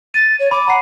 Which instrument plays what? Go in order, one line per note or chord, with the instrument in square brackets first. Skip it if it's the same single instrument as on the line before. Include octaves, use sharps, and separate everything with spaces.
[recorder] A6 [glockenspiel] D#7
[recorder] C#5
[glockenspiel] B5 [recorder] D6
[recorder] F#5 [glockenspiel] A#5 C7